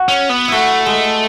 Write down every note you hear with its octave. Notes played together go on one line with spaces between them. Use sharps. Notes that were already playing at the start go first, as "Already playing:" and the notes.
Already playing: F#4
C#4
B3
A3 E4 F#4
G#3